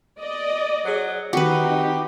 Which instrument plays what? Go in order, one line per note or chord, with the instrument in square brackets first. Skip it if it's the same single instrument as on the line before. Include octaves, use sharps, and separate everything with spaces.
[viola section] D5 D#5
[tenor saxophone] F#3 [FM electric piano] G#4 C5
[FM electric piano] D#3 C4 [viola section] D#4 [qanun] F#4 B4 [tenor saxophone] G4